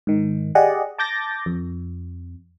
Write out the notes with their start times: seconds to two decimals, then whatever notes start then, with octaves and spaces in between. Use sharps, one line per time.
0.07 G#2 D#3
0.55 G4 G#4 D5 D#5 F#5
0.98 A5 D6 G6 A6 A#6
1.46 F2